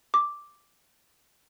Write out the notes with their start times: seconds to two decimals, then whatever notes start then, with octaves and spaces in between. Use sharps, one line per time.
0.14 D6